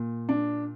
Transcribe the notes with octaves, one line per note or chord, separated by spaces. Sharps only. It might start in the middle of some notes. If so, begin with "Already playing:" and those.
Already playing: A#2
D4